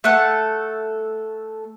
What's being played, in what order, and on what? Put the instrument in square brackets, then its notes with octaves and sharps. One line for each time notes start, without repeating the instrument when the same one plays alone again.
[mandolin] A3 A4 F#5